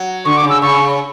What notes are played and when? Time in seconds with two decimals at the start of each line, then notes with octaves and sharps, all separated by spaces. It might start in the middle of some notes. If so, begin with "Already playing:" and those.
Already playing: F#3
0.25 D3 C#6
0.37 D6
0.43 C#3
0.50 E6
0.62 C#3 C#6